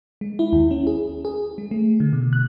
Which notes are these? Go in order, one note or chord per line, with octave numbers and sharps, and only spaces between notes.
G#3
E4
D#2
C#4
G#4
G#4
G#3
A3
D3
B2
F#6